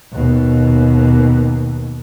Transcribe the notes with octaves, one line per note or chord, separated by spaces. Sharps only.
D#2 B2